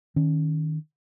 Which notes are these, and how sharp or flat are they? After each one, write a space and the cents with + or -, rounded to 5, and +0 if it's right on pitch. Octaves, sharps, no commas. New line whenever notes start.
D#3 +0 C#4 +0